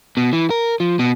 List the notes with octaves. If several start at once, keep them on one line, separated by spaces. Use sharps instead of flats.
B2
E3
A#4
F3
B2